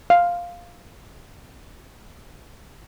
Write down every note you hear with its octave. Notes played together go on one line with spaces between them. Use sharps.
F5